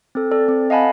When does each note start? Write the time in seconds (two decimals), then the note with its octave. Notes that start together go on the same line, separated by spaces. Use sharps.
0.15 C4 A4
0.31 A4 D5
0.48 C4
0.70 D#5 F5 F#5 G#5 A5 B5